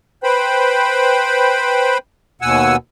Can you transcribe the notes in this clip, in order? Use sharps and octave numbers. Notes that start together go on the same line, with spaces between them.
B4 C5 G5 B5
D#2 B2 F#5 G#5 E6